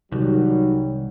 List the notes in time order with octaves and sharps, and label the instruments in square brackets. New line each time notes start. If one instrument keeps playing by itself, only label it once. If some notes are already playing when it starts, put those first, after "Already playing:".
[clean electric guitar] C2 [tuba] D#3 [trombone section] F#3 G3